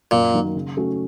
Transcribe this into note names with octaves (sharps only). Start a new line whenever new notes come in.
F#2 A#2
D#3 F#3 A#3
C#3
F#3 A3 C#4 F#4